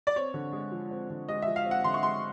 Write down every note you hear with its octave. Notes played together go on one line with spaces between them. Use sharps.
D5
C4 C#5
D3
G#3
F3
C4
D3
G#3 D#5
F3 E5
F5
C4
F#5
D3 C6
C#6
G#3 C6